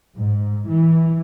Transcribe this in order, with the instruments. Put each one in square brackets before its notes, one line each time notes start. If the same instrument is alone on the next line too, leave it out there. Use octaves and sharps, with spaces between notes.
[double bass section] G#2
E3